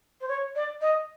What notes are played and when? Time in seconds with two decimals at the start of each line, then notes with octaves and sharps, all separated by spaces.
0.20 C5
0.28 C#5
0.55 D5
0.81 D#5